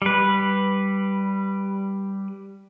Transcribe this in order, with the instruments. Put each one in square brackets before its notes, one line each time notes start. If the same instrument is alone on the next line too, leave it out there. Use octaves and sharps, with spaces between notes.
[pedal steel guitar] G3 B4